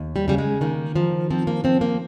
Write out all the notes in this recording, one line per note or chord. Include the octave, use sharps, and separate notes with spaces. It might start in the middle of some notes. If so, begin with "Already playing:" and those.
Already playing: D#2
G3
C#3 G3
G#3
D#3 A#3
D#3 F3
F3 C4
A#3
F3 C4
A#3